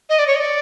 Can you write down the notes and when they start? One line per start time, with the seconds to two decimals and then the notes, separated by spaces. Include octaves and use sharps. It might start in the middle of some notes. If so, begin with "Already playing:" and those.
0.10 D#5
0.19 D5
0.27 C#5
0.36 D#5
0.40 D5